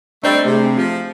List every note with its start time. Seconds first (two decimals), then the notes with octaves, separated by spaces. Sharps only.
0.23 G3 A3 C4 D4 D5 D#5
0.45 C3 A3 G#4
0.63 C4
0.77 F3